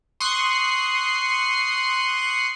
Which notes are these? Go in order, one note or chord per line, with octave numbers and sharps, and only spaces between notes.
C6 C#6 D#6 F#6 C7